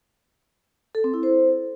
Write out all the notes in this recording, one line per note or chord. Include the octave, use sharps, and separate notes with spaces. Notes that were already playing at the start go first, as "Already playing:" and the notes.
A4
C4
E4
C5